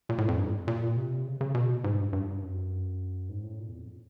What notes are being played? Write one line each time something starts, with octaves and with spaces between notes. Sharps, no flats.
A#2
A2
F2
G2
A#2
C3
C#3
C#3
B2
G#2
G2
G2
F#2
G#2
A2
A#2
E2
F2